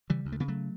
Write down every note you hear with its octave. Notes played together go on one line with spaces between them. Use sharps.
C#3 E3 G3
D2
A3
C#3 B3
F#3 A3